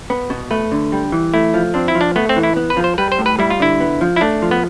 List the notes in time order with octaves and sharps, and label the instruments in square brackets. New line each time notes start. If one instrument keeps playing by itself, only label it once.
[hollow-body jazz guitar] B3
B2
[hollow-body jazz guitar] A3 [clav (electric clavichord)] B4
[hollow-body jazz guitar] D3
G3
E3
[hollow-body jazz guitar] A3 [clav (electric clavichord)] E4
[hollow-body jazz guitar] F3
[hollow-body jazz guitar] C4 [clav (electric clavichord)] D4
[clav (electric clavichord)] E4
[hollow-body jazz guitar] F3
[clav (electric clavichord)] D4
[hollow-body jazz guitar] A3 [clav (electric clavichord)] B3
[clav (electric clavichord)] C4
[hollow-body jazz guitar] E3
[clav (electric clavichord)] E4
[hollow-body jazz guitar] B3
[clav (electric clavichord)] B4
[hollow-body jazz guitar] F3
[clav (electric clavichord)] C5
[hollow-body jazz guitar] G3 [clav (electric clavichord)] B4
[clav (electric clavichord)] C5
[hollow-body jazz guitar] A2
[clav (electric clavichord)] B4
[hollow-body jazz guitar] G3 [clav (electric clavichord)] E4
[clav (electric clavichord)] F4
[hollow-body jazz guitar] D3 [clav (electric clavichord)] E4
[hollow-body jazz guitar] B3
F3
[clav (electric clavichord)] E4
[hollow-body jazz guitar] A3 [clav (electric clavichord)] D4
[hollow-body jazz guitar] F3
[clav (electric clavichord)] B3